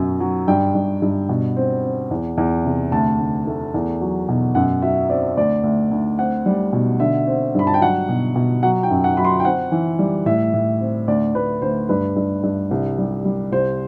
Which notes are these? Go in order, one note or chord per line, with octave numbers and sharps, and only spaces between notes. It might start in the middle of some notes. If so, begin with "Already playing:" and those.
Already playing: F#2 B2 F#3
F#3
G2 G5
G2
G2
B2
C4
C4
E2
E2
C3
D2 A5
D2
A3
E2
F#3
B2
F#2 F#5
F#3 E5
C4 D5
D2 D5
D2
D2
C4 F#5
G3
B2
D3 E5
C4
G2 B5
A5
G5
F#3 F#5
B2
B2
F#3 F#5
G5
F#2
F#5
F#3 B5
C6
G5
C4 F#5
E3
G3
A2 E5
A2
C4
D2 D5
D2 B4
D2 C5
G2 B4
G2
G2
C2
G3
G3
C2 C5